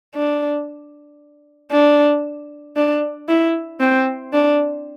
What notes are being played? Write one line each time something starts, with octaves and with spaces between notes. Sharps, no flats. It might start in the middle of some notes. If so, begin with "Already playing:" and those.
D4
D4
D4
E4
C4
D4